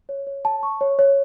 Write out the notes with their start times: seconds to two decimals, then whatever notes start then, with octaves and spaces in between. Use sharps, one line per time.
0.09 C#5
0.27 C#5
0.45 A5
0.63 C#6
0.81 C#5
0.99 C#5